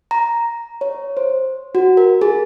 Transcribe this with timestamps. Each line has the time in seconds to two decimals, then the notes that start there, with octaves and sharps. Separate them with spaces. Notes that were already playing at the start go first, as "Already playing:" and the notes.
0.11 A#5
0.81 C#5
1.17 C5
1.75 F#4
1.97 A#4
2.22 G#4